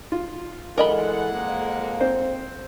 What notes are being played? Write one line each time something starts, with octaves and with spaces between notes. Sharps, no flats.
F4
E3 G#3 A4 A#4 D#5 F#5 B5
F2 A#3
C4 C5